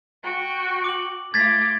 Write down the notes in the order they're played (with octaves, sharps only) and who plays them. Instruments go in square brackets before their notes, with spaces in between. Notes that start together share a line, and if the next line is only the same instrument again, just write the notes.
[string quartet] F#4 G5 C#6
[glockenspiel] D6 F#7
[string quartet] A3 F4 D6 [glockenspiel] G#6 A6 B6